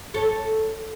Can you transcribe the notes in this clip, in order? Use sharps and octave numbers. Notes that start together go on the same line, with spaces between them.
A4 C#5